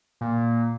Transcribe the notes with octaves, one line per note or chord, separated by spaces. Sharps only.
A#2